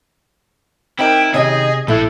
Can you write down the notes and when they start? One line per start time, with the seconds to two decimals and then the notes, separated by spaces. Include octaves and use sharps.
0.99 C4 D#4 E4 A#4 G5
1.34 C3 D#3 C#4 G#4 D#5 G5
1.88 A#1 A2 A3 E4 A4 F#6